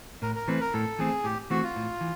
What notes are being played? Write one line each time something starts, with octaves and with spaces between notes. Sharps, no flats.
A2 A#4
A#4
E3 A3 C4 B4
A#4
A2 A4
E3 A3 C4 G#4
A2 G4
E3 A3 C4 F#4
F4
A2
E3